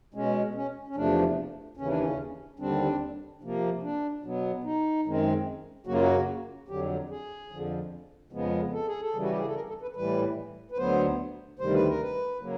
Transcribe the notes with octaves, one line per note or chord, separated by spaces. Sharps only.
B2 G#3 C#4
C#4
C#4
E2 C3 F3 A3 D4
D#2 C#3 E3 C#4
D4
C#4
D#2 D3 G3 C4 D4
C3 F3 A#3
D4
B2 F#3 B3
D#4
F#2 D#3 G#3 C4
F#2 C#3 F#3 A#3 F#4
F4
F#4
F2 D3 F#3 G4
G#4
F2 D3 F3
F2 C#3 F3 G#3 B3
A4
G#4
A4
C#3 E3 G3
F#4
G4
G#4
A4
A#4
A4
B4
A2 E3 G3 B4
B4
D2 D3 F#3 B3 C5
D2 C3 D#3 G3 C5
B4
A#4
B4
C#3 F#3 A#3